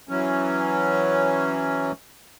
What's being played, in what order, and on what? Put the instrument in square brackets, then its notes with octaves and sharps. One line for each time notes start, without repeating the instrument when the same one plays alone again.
[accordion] E3 F#3 C#4